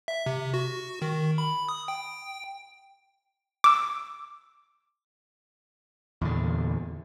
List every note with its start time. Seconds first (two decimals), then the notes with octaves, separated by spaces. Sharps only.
0.08 E5
0.26 C3
0.54 F#4
1.02 D#3
1.38 B5
1.69 D#6
1.88 G5
3.64 D6 E6
6.21 E2 A#2 D3